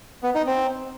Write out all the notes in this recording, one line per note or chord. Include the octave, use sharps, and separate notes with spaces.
B3
D#4
C4